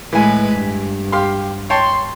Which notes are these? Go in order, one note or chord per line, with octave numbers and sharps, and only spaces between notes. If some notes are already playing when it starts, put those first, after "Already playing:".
A2 E3 G#3 B4 G#5
G2
G4 F5 C6
C#5 G5 A5 C6